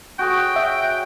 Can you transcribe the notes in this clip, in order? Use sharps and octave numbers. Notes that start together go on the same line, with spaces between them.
F#4 G#4 C#5 G5
E5